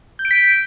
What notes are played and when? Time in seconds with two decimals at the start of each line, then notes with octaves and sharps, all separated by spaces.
0.19 G6
0.25 D7
0.31 B6